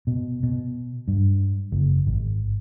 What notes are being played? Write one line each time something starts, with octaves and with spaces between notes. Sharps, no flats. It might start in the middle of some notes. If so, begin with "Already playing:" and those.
B2
B2
G2
F#1
G#1